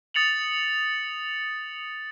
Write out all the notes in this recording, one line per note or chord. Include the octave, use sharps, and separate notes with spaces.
D#6 A6 C#7 F7 F#7